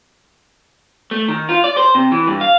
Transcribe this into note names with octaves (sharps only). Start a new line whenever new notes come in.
A3
D#3
F4
D5
C5
C3
E3
G2
F5